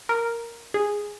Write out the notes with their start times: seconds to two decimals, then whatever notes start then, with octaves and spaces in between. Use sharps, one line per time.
0.09 A#4
0.74 G#4